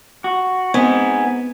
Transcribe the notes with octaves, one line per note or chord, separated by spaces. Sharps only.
F#4
B3 C4 D#4 G#4 G#6